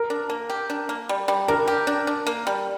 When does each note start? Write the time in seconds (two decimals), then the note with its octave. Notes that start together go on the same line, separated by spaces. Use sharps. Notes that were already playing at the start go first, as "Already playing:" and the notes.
Already playing: A#4
0.10 D4
0.30 A#3
0.50 G4
0.70 D4
0.89 A#3
1.09 G3
1.28 G3
1.48 D4 A#4
1.68 G4
1.87 D4
2.07 D4
2.27 A#3
2.47 G3